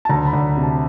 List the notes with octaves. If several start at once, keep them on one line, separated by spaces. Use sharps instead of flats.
A5
D2 A#5
B5
D2
C3
A5